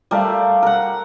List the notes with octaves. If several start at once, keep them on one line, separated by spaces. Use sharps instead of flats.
G3 A3 A#4 F5
A#4 F#5